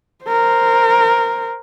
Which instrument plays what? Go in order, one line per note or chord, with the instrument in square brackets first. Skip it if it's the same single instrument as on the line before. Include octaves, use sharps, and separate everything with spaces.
[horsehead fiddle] A#4 C5